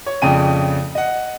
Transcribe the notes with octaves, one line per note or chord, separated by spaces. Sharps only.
C#5
A#1 F2 C#3 G5 D#7
D#5 F#5